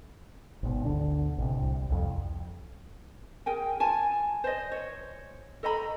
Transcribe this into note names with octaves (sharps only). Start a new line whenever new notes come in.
G#1 B2
D2 D3 D4
A1 C3
C2
C2 F2
G#4 A#4 G5 G#5
F4 G#5 A5
C5 D5 D#5
C#5
A4 D#5 A#5 B5